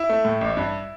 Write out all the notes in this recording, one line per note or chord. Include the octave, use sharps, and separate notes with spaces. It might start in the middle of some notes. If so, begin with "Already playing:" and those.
Already playing: E4
A3
A2
A1
G2